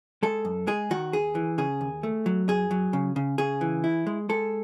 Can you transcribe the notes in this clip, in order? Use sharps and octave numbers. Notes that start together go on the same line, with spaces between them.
G#3 A4
F#2
G#3 G#4
D#3 F#4
D#2 G#4
E3
C#3 G#4
D#2
A3
F#3
F#2 G#4
F#3
C#3
C#3
C#3 G#4
E3
E4
G#3
G#3 A4